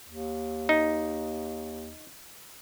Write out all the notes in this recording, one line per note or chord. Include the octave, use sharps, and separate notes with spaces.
D#2
D#4